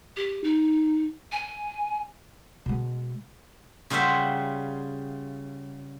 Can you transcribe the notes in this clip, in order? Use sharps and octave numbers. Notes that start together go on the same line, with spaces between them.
G4
D#4
G#5
B2 G#3
C#3 G3 F4 C5 E5 F#5